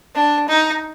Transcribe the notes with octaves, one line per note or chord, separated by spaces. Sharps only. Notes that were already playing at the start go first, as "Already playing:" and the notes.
D4
D#4